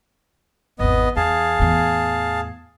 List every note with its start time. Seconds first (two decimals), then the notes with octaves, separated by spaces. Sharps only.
0.79 G#1 E2 B3 D#5
1.17 E2 G#4 F5 A5
1.59 E2 A2